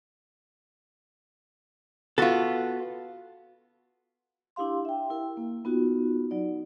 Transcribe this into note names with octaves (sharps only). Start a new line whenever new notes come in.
B3 F4 F#4 A4
D4 E4 G4 F5 C6
E5 G5
E4 A#4
A#3
B3 D#4 F4 F#4
F#3 D#4 D5